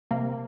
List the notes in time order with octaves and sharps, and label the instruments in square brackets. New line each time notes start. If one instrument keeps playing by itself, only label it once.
[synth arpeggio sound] C3 A#3